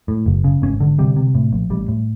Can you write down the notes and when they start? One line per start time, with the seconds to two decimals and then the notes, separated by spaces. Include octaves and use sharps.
0.08 A2
0.26 F#1
0.44 C#3
0.62 G#1 C#4
0.80 D3
0.98 C3 G3
1.16 C3
1.35 A2
1.53 A#1
1.70 A1 G3
1.88 A2